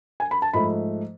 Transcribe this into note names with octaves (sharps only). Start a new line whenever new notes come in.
G#5
B5
A5
G#2 F3 A3 B5